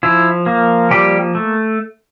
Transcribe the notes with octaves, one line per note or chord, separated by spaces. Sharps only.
F3 E4
A#3
F3 G3 G4
A3